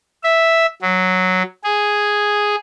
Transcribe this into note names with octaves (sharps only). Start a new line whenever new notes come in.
E5
F#3
G#4